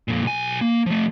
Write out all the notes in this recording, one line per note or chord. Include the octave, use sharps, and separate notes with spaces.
F2 A#2
B1 G#5
A#3
F3 A3